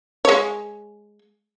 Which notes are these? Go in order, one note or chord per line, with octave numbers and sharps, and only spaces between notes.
G#3 C#5